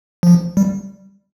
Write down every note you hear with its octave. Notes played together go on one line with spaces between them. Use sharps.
F3
G3